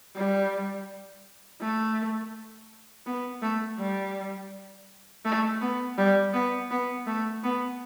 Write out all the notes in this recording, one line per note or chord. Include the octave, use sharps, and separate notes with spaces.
G3
A3
B3
A3
G3
A3
B3
G3
B3
B3
A3
B3